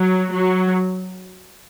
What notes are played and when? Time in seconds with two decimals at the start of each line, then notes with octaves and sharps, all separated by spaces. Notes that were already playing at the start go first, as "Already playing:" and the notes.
Already playing: F#3
0.31 F#3